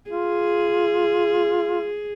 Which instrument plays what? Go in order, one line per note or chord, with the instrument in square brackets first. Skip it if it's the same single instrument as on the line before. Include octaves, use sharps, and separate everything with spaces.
[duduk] F4 [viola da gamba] G#4